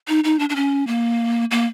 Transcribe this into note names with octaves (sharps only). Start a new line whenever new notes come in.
D#4
D#4
D4
D4
C#4
A#3
A#3